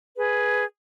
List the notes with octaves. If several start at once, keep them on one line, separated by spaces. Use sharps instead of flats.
G#4 B4